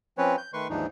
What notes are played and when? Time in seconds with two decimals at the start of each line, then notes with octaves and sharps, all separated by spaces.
0.18 F3 C4 C#4 B4 C#5
0.38 G6
0.53 D#3 A3 B4 C6 C#6
0.70 D#2 G#2 E3 F3 D4 D#4